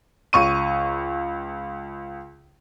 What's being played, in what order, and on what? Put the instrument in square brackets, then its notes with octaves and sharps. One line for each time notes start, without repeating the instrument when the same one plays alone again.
[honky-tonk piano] C#2 C#6 D#7